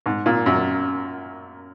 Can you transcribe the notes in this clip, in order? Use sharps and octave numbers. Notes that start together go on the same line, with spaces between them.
G#2
A#2
F#2